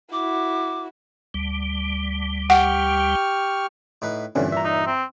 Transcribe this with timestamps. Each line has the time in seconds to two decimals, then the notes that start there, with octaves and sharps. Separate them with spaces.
0.12 E4 F#4 D6
1.34 D2 G3
2.50 G4 F#5 C#6 F6
4.02 A2 D#4 B4
4.35 G2 A#2 D3 E3 C4 C#4
4.52 E5 A#5
4.64 D#4
4.86 C4